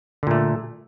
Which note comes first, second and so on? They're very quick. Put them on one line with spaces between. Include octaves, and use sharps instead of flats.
D3 A#2 A3